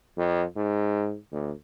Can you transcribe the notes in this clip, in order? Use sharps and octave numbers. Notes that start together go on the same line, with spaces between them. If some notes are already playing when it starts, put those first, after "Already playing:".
F2
G#2
D2